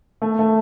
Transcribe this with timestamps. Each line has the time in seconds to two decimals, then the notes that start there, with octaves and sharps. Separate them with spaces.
0.22 A3
0.39 A3